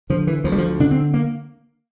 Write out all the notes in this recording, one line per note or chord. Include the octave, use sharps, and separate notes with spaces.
D3 F3
E3
D2 F3
G3
F3
D3 D4
C4
A#3